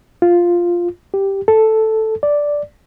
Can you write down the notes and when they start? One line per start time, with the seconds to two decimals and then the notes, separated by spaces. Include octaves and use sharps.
0.22 F4
1.14 G4
1.48 A4
2.23 D5